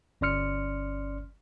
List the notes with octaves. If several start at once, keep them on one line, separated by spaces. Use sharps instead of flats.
G1 C#4 D5 C6 F6 C#7